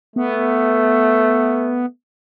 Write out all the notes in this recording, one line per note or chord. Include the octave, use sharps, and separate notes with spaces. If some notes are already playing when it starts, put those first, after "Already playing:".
A3 B3